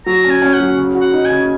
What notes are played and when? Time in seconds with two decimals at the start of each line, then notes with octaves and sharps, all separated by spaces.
0.06 F#3 A#5
0.24 C#4
0.30 G#5
0.42 C#4
0.54 F#5
0.60 F#3
0.77 C#3
0.95 F#4
1.01 F#5
1.13 D#4
1.25 G#5
1.30 C#3